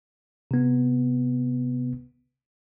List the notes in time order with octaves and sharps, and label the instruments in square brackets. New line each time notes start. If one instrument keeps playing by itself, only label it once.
[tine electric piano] C3 B3